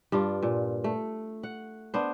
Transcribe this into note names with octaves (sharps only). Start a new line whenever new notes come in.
G2 D4 F4
A#2
A3
F#5
B3 D4 C5